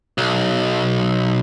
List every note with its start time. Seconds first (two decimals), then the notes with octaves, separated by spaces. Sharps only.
0.18 B1